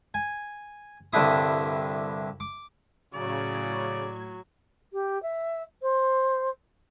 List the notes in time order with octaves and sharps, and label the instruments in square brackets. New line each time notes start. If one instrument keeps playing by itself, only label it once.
[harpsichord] G#5
C2 G2 D3 D4 E4 D#6
D6
[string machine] A2 G#6 [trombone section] C#3 [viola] F#3 [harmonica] D5
[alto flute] G4
E5
C5